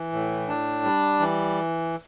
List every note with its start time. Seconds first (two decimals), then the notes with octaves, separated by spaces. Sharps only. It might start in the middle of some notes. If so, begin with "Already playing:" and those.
Already playing: E3
0.12 A2
0.48 D4
0.84 G3
1.20 E3